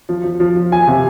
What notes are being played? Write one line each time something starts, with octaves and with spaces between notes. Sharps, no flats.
F3
F3
F3
F3
F3 G#5
C3